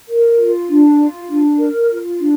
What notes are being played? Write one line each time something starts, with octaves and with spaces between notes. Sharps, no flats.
A#4
F4
D4
F4
D4
A#4
F4
D4